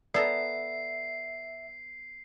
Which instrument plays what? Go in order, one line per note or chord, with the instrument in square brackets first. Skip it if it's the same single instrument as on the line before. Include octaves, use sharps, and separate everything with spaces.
[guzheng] B3 A4 A#5 [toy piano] D5 [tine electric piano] E5 [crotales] C7